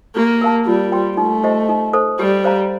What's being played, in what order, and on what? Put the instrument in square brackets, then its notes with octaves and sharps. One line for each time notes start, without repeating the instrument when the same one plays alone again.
[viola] A#3 [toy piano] G4
[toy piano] A#4 F5 A5
[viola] G3 [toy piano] F4
[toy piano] C5 G5 C6
[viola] A3 [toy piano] D#4
[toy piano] G4 C5 D#5
D#4
A4 C5
[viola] G3 [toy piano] G4
[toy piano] C5 F5 A#5